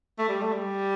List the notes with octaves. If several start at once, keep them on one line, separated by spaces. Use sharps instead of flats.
A3
G3
A3
G3